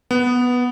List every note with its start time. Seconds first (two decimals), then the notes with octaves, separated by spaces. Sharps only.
0.11 B3